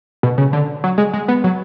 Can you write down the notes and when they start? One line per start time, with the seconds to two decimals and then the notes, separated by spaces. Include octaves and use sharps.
0.23 B2
0.38 C#3
0.53 D3
0.84 F#3
0.98 G#3
1.13 G#3
1.28 B3
1.44 F#3